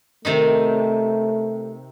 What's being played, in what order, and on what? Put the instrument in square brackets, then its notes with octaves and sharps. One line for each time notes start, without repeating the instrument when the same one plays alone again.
[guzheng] C3 D#3 D#4 [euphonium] A3